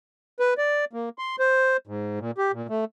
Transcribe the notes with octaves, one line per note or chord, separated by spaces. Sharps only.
B4
D5
A#3
C6
C5
G#2
A#2
G4
A#2
A3